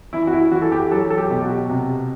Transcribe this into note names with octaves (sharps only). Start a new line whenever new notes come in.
E3 E4
F#4
E4
E3 F#4
A4
G4
F#3 A4
A4
G4
B2 G4
F#4
C3